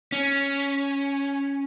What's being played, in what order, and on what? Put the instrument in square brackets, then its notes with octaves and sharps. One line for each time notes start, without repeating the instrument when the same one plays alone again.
[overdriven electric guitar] C#4